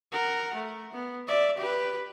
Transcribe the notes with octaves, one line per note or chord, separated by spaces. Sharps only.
A#4 F#5
A3
B3
D5 E5
G4 B4